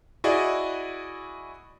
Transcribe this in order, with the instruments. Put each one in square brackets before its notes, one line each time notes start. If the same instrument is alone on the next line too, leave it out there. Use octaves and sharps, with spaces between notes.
[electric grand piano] E4 F#4 G#4 D5 D#5